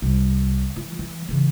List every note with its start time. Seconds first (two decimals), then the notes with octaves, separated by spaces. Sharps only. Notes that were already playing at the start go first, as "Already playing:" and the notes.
0.02 C2
0.76 E3 F4
0.99 E3
1.28 C#3 E3